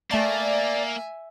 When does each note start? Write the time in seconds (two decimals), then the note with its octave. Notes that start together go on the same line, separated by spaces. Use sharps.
0.11 A3 A#3 D5 E5 G#5 A5 A6